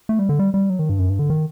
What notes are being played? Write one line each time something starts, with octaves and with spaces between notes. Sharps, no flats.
A3
G3
D3
G3
G3
F#3
D#3
G2
F#2
G2
D3
D#3